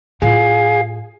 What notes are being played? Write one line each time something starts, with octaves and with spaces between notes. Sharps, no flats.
A2 F4 G#4 F5